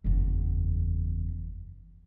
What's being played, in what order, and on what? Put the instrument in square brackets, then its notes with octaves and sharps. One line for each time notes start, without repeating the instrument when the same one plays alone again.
[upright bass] F#1 E2